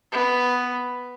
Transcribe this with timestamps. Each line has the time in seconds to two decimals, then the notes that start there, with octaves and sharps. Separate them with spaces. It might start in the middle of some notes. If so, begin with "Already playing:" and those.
0.12 B3